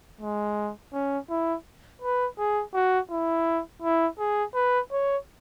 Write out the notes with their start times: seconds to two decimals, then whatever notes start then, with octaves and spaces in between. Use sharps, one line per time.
0.21 G#3
0.93 C#4
1.30 E4
2.02 B4
2.39 G#4
2.74 F#4
3.11 E4
3.82 E4
4.19 G#4
4.55 B4
4.92 C#5